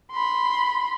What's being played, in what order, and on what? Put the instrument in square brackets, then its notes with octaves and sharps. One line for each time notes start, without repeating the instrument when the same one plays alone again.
[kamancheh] B5 C6